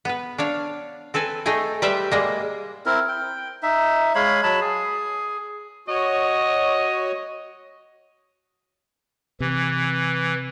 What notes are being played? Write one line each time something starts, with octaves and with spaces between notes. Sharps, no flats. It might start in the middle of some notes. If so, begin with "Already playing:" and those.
B3 B4
D4 C#5 F5
C4 A4 B4 G#5
A3 D#4 G#4 G5 G#5
G3 G4 B4 C5 E5
G3 G#3 A#3
C4 E4 A#4
G5
D#4 E5
G#3 C#5 F5 B5
F#3 A5 B5
G#4
F#4 C#5 D#5
C3 E3